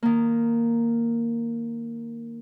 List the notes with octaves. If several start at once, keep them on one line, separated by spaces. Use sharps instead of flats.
D#3 A#3